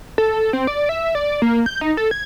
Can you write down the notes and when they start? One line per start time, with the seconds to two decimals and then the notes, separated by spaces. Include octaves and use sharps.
0.18 A4
0.53 C4
0.67 D5
0.89 E5
1.15 D5
1.42 A#3
1.66 G6
1.81 D#4
1.97 A4
2.11 G#6